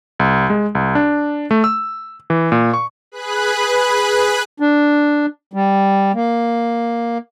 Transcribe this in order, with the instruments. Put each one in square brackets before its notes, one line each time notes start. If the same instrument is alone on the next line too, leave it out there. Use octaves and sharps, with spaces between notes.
[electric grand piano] C2
G#3
C2
D4
A3
E6
E3
A#2
C#6
[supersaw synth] G#4 B4 B5 F#6
[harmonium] D4
G3
A#3